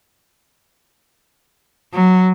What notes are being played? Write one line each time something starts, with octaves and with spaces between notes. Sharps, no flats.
F#3